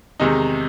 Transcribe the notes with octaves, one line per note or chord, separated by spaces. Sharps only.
E2 C3 D#3 G#3 D#4